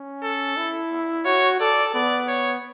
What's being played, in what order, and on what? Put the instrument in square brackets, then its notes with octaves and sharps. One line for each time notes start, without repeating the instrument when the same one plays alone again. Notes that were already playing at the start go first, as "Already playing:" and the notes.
Already playing: [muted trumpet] C#4
[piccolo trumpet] A4
[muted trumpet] E4
[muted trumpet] F#4 [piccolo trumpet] C#5
[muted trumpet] A4 [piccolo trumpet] D5
[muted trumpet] B3 [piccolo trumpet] D5
[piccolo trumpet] C#5